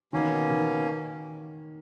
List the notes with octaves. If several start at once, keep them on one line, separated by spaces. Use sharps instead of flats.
B2 D#3 A#3 C#4
D#3